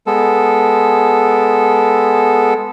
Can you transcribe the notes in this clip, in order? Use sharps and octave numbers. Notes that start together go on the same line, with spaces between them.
G#3 B3 A4